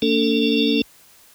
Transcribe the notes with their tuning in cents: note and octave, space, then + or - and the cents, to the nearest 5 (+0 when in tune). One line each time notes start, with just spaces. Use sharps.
A#3 -35 D4 -40 A4 +20